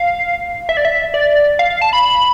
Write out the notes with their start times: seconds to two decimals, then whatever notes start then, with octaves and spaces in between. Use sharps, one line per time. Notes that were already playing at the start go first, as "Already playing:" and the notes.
Already playing: F5
0.69 E5
0.77 D5
0.85 E5
1.14 D5
1.59 F5
1.70 F5
1.81 A5
1.93 B5